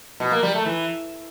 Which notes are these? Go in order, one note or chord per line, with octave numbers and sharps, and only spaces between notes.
B2
A#3
G3
A3
E3